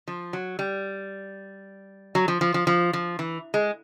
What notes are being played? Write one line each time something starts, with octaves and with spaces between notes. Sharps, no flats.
F3
F#3
G3
F#3
F3
F3
F3
F3
F3
E3
G#3